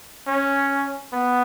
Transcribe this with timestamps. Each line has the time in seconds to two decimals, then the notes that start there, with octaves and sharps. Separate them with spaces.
0.27 C#4
1.13 B3